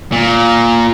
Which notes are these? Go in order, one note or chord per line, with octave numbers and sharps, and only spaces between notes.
A#2